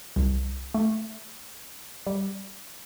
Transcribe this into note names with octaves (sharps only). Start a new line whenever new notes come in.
C2
A3
G3